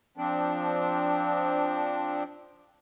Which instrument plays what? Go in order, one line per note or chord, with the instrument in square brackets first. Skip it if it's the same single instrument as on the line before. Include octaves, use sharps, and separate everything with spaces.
[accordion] F3 C4 D4